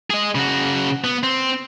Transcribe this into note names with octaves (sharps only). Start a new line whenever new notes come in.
G#4 D#5
C#3 F#4
B3
C4